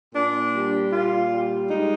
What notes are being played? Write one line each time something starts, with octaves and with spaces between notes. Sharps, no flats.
A#2 D4
G3
A#2 F4
G3
G#3 D#4